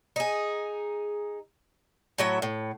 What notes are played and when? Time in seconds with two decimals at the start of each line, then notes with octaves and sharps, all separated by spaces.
0.16 D#4 G#4
2.18 A2 F#3 E5
2.42 A2